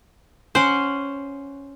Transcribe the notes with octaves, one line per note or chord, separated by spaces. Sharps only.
C#4 C5 F#5 D6